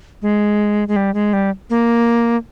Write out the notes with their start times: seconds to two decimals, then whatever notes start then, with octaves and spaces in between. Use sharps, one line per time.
0.22 G#3
0.88 G#3
0.96 G3
1.14 G#3
1.33 G3
1.70 A#3